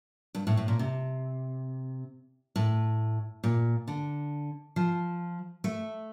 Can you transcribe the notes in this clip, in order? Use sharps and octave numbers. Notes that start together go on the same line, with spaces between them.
G2
A2
A2
A#2
C3
A2
A#2
D3
F3
A3